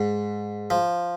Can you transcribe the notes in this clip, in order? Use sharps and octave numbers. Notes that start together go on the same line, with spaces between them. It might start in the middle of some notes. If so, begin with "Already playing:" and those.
Already playing: G#2
F3